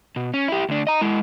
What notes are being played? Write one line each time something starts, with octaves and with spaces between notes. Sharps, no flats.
B2
C#4
E4 G4
D2 D4
D#5 A#5
G#3 E4